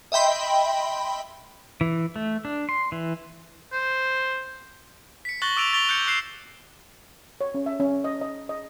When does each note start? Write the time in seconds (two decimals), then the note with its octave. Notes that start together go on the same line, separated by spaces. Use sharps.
0.12 D#5 E5 G5 B5 C6
1.81 E3
2.16 A3
2.45 D4
2.69 C6
2.92 E3
3.72 C5
5.25 B6 C#7
5.42 C#6 F#6 A6 A#6 F#7 G7
5.57 D6 E6 A6 D7 D#7 F7
5.73 C#6 A6 B6 F7 G7
5.89 F#6 G6 C#7
6.07 D6 F#6 C7 E7
7.41 C#5
7.54 C#4
7.66 E5
7.80 C#4
8.04 D#5
8.21 D#5
8.49 D#5